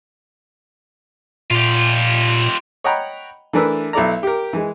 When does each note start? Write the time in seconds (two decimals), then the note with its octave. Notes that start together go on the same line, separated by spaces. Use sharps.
1.51 A#2 F4 G4
2.84 C#5 D#5 F#5 G5 A#5 B5
3.53 E3 A3 D4 A#4 B4 E6
3.93 B1 E4 A4 D5 A#5
4.23 G4 A#4
4.53 E3 G#3